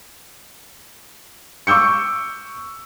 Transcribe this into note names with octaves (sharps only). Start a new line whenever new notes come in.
C#6 D6 E6 G6 C#7